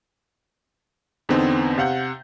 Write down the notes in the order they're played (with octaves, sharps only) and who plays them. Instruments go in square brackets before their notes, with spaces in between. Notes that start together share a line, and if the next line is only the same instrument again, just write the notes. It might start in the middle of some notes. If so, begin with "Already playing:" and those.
[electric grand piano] E2 D3 B3 C4 D#4
C3 F5 F#5 G6